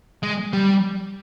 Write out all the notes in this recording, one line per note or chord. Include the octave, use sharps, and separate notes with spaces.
G#3
G3